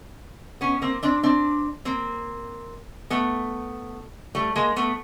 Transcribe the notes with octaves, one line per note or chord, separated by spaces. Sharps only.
B3 C#4
A#3 C4
C4 D4
C4 D4
A#3 C4
A3 B3
G3 A3
G#3 A#3
A3 B3